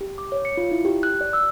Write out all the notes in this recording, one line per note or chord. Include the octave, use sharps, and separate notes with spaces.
G4
D6
C#5
C#7
F4
E4
G4
F#6
D5
E6